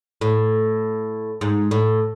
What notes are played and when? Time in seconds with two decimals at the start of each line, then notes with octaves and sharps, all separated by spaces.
0.21 A2
1.41 G#2
1.71 A2